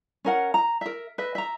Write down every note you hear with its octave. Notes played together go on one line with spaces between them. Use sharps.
C#4 A#4 F#5
A#5
A#4 E5
B4 D#5 E5
E5 A#5